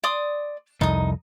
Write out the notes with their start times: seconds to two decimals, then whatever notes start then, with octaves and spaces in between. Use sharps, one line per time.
0.04 D5 C6 D#6
0.81 C2 F2 D#4 D#6